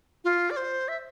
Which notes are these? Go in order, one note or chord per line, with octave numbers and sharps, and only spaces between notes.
F4
D5
C5
E5